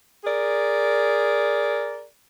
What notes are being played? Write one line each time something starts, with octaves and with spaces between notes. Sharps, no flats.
G#4 A#4 D5